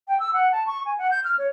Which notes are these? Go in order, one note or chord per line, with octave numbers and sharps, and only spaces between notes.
G5
E6
F#5
A5
C#6
G#5
F#5
G6
F6
C#5